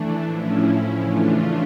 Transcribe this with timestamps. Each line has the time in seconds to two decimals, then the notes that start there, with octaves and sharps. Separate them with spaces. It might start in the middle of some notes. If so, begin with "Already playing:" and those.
Already playing: E3 A3 D4
0.26 A2 F3 C#4 E4
0.99 C#3 E3 A3 D4 F4